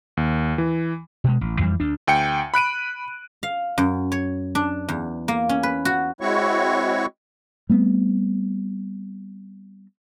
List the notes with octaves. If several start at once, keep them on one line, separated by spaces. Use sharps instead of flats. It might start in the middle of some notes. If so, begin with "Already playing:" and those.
D#2
E3
B2 G#3
A1
F2 E3 F3 G3
D2 D4
D2 G5 C#7
B5 F#6 D7 D#7
F5
F#2
C#5
D4
E2
A#3
C#4
B4
F#4
G#3 C4 E4 F#4 C#5 C#6
G3 A3 B3 C4